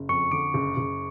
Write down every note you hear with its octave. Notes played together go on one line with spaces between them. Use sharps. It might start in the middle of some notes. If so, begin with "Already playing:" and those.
Already playing: F#1
F2 C#6 C#7
D3 D6 D7
F#1
F#1